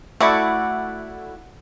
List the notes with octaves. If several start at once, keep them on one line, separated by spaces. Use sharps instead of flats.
A3 E4 F#4 D5 F#5